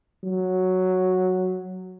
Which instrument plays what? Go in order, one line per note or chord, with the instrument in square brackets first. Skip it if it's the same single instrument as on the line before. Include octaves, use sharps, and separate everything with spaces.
[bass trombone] F#3